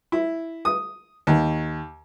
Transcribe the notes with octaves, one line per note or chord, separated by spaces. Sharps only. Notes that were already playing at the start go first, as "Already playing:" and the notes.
E4
D#6
D#2